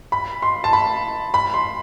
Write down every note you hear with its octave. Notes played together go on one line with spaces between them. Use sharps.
B5
C6
A5
B5
B5
C6